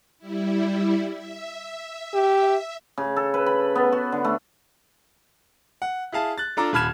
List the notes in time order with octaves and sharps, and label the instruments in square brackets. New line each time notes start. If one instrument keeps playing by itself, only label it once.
[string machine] G3 E4
E5
[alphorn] G4
[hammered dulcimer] C#3
A4
B4
B5
B3
F#4
D3
A3
[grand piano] F#5
E4 G#4 F5 A5
F#6 A6
D4 F4 A4 A#5 D6
D#1 A5 B5 F6 G#6 E7